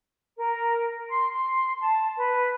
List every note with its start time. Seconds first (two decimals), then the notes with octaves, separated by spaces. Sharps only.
0.37 A#4
1.09 C6
1.32 C6
1.80 A5
2.17 B4